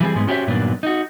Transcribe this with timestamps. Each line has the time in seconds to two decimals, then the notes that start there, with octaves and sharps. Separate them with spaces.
0.01 E3 G3 C4 G#4
0.15 G#2 G#3 B3
0.27 C#4 F#4 G4 C5 C#5 E5
0.47 G2 A#2 D#3 F#3 B3 D4
0.83 D#4 F#4